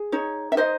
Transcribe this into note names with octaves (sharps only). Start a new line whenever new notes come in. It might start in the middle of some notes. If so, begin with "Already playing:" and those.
Already playing: G#4
D#4 C#5
E5
D#4 C5 D#5